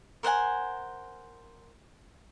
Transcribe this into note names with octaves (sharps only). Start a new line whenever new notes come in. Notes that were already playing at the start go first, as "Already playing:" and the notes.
A#4 C5 F#5 G#5